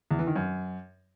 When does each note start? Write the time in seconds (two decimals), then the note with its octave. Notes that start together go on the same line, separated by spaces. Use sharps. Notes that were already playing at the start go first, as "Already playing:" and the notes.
0.11 E2
0.19 E3
0.27 D#3
0.36 F#2